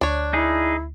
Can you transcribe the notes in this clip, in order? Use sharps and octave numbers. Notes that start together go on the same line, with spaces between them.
D2 D4 C#5
D#4 E4 G#4